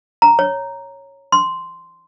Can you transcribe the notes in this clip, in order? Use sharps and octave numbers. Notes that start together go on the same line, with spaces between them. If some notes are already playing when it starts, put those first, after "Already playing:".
A#5
C#5
C6